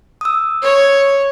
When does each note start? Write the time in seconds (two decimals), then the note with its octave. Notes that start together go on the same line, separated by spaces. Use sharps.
0.21 D#6 E6
0.62 C#5